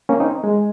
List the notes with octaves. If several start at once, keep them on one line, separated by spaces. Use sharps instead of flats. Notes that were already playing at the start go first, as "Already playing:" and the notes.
A#3 C#4
C4 D#4
G#3